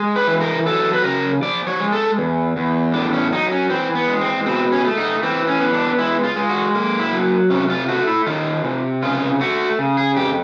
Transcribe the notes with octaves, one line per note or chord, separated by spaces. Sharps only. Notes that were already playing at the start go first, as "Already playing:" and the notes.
Already playing: G#3
B4
E3
A#4
F#3 A4
B4
C#3 A#4
F3 D5
C#5
G#3
A4
E2
E2
A2 D4
C#4
F#3 D#4
C#4
E3 C4
B3
G#3
C4
B2 C4
C#4
A3
D#4
E3 C4
C#4
B3
D4
G#3 E4
F4
G#3
F#4
A#3
E4
F#3
C3 C#4
F4
A3 F#4
E4
D#3 F4
C3
C#3 F4
A3 F#4
C#3
G#4
F2 G4